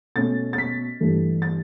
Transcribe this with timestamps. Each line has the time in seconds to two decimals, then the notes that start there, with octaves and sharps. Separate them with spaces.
0.16 B2 A3 C#4 A6
0.53 A6
0.58 B6
1.00 G2 E3 A3
1.42 A6